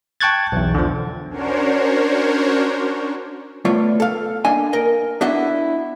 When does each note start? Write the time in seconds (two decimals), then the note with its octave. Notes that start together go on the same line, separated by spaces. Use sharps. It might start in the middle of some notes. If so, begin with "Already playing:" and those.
0.21 G5 A5 C#6 F#6 G#6 A6
0.52 B1 E2
0.74 D3 F3
1.30 C#4 D4 F#4 A#4 C5 C#5
3.65 A3 B3 F4 C#5 D5
4.00 A4 F5
4.45 A#3 D4 D#5 G#5
4.73 A#4 D#5
5.21 B3 D4 E4 F#4 D#5 E5